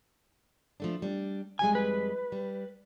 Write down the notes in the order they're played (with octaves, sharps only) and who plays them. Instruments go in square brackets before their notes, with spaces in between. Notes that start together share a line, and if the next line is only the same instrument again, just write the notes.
[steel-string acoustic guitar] F3 A3 D4
G3 D4
[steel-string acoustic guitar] F2 G3 G#3 [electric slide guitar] G#5
[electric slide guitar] B4
[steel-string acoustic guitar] G3